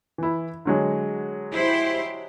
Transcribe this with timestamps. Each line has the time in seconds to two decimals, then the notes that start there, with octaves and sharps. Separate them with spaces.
0.18 E3 E4
0.65 D3 F#3 G#3
1.52 E4 G4 C5